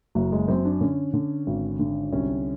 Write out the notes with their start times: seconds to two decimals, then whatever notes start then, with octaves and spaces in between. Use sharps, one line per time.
0.15 F#1 F#3
0.32 G#3
0.48 F#2 C4
0.65 D4
0.81 D3 C#4
1.13 D3
1.47 G#1
1.79 D3
2.12 C2 C#4